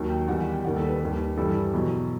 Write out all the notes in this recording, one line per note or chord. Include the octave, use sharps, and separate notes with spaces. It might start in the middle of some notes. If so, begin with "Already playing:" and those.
Already playing: D#2 D#3 F#3
G5
E2 D#3 G3 F#5
F#5
G5
D#2 D#3 G3 F#5
A4
B4
D#2 D#3 G3 B4
G2 E3 G3 A4
E2 B2 F#3